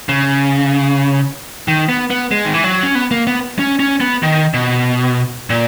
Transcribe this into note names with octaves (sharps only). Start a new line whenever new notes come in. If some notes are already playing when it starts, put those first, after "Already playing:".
C#3
D#3
B3
B3
G#3
D#3
E3
F#3
C#4
B3
A#3
B3
C#4
C#4
B3
D#3
B2
A#2